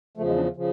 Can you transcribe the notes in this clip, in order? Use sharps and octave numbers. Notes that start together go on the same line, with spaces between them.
E2 C#3 F3 A3
G#3
D4
C#3 F3